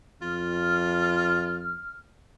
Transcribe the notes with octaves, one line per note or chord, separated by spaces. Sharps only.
F2 F4 F6